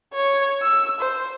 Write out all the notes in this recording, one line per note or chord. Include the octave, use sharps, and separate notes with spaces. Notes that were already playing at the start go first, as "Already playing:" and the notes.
C#5
E6
C5